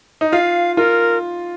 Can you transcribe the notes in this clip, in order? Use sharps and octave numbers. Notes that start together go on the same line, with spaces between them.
D#4
F4 F5
F4 A#4